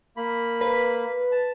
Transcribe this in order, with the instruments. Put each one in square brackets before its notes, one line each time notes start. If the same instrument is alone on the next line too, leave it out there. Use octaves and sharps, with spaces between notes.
[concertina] A#3 B5
[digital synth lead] B4
[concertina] A5